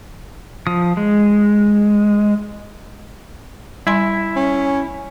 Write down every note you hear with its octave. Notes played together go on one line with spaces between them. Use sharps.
F3 D#6
G#3
G3 E4 G#5 C6
C#4